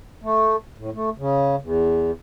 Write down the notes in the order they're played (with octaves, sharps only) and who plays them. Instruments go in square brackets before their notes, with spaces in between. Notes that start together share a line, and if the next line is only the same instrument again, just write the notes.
[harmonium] A3
A2
A3
C#3
E2